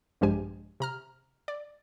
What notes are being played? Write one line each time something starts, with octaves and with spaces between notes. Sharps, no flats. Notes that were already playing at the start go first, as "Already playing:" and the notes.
A#1 G2 F3 G#3 G4 G#5
C3 A#5 F6
D5